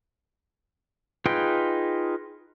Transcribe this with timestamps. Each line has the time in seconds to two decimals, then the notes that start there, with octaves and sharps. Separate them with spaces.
1.26 D#4 F4 G#4 B4 G5